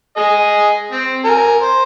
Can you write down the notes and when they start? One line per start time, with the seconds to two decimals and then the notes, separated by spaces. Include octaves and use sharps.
0.17 G#4 D#5
0.92 C4
1.24 A#4 G#5
1.62 C5